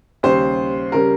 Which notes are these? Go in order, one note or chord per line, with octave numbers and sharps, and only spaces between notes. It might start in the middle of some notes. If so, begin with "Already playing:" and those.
D#2 C#3 G3 C5
C#3 G3 A#4